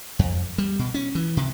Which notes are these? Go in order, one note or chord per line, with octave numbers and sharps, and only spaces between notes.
F2
G3
B2
C#4
E3
C3